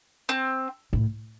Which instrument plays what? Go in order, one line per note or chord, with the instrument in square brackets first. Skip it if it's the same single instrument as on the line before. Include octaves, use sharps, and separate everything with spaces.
[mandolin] C4
[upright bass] A2